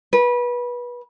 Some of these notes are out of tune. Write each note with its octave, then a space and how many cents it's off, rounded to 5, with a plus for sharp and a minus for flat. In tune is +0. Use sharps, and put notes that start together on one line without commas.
B4 -25